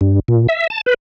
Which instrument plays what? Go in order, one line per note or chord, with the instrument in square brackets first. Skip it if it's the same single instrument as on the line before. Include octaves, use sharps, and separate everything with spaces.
[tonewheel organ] G2
A#2
E5
A5
B4